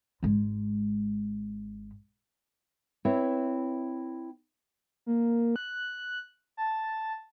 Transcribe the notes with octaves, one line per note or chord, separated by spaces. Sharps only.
G#1 G#3
C4 E4 B4 C#5 E5
A#3
F#6
A5